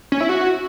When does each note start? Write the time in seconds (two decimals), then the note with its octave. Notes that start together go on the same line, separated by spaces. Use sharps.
0.12 C#4
0.21 E4
0.29 F#4